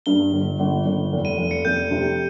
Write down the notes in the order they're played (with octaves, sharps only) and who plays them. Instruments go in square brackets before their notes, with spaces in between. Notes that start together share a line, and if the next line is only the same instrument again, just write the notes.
[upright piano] G2 [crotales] G7
[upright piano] G1
G1
G1
F1
[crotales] D#7
[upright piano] F1
[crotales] C#7
[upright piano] F1 [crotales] G6
[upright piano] C3